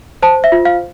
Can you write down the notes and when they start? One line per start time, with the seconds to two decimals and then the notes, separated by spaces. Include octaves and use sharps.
0.22 C5 A5
0.44 E5
0.52 F4
0.65 F5